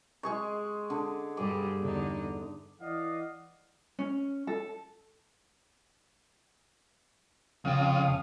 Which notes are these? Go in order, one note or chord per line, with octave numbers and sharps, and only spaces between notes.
G#3 G#4 C#6
D3
G2 G3 G#4 D6
E2 D3 D#4
E3 D5 D#5 F5 F#5
C#4
A4
F2 C#3 F5 G5 D#6